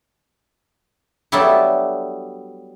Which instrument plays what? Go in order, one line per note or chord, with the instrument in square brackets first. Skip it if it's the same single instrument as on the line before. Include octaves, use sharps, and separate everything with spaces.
[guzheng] F#3 G3 A3 B3 D4 E4